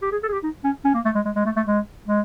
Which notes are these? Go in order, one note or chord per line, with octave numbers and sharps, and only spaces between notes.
G4
G#4
A4
G#4
G4
D#4
C#4
C#4
A#3
A3
G#3
G#3
G#3
A3
A3
G#3
G#3